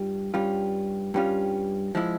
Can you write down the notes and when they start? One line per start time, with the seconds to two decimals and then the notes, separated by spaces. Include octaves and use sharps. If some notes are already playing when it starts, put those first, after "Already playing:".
Already playing: G2 G3 F4
0.34 G2 G3 C#4 F4
1.14 G2 G3 C#4 F4
1.95 F3 G#3 E4